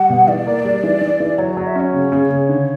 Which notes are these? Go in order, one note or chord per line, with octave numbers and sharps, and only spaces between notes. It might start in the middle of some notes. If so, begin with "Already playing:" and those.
Already playing: G3 F#5
B2
E3 D5
A#3
G3
E3
E3
E3
F#3 C#5
F#3 D5
E5
C#4 C#5
C#3
C#3
C#3
D3